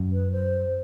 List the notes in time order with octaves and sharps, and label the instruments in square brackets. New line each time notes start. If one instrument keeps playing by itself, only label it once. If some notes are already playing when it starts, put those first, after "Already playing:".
Already playing: [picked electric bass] F#2
[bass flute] B4
C5